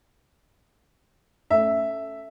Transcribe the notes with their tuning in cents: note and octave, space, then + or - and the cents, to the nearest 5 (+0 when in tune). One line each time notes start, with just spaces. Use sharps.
A3 +0 C#4 +0 E5 +0